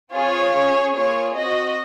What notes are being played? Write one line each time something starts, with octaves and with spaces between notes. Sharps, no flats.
C4 F4 G#4 C#5
C#4 G#4
A#3 F4 G#4 C#5
C4 F#4 D#5